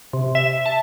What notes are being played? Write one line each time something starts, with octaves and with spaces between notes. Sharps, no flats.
C3
E5
A5